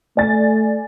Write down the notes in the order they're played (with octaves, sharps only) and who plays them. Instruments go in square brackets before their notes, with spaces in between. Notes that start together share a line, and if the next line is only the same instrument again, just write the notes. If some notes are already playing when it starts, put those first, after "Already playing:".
[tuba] A3 [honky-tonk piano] D5 G#5 A6